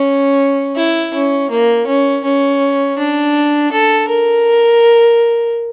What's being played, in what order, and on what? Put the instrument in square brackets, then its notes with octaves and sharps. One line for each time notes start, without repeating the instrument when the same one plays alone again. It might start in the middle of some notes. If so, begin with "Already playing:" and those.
Already playing: [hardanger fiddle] C#4
E4
C#4
A#3
C#4
C#4
D4
A4
A#4